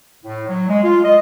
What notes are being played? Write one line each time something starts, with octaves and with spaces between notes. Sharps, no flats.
A2
F#3
G#3
F4
D#5